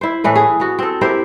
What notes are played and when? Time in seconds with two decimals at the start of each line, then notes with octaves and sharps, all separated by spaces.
0.01 E4 C5
0.24 A2 E3 A3 B4
0.35 G#4
0.60 B3 F#4
0.79 C4 A4
1.01 E4 G4 A#4 C5